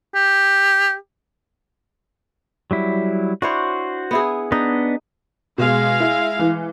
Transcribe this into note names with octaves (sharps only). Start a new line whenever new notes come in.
G4
F#3 G3 E4
D4 E4 F#4 C5 C#5
B3 E4 G#4
B3 D4 D#4 D#5
B2 G#3 F5
E4
E3